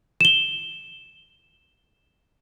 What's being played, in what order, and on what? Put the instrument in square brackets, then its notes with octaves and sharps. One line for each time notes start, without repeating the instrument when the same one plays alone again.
[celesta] E7 G7